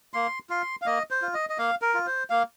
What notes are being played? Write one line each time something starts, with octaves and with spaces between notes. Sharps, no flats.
A#3 C6
F4 C6
F5
A#3 D#5
C5
F4
D#5
D#5
A#3 F5
A#4
F4
C5
A#3 F5